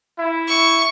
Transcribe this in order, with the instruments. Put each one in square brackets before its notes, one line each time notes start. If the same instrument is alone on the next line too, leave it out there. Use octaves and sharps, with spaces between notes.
[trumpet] E4
[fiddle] C#6